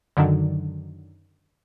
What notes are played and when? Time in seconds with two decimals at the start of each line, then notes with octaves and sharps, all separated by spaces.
0.17 F#2 D3 D#3 F#3 D4